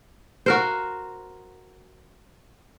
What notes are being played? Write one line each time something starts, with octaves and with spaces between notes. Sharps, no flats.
F#4 A#4 C5